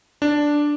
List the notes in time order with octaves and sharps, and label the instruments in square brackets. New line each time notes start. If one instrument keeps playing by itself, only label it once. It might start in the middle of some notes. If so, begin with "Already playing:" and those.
[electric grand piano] D4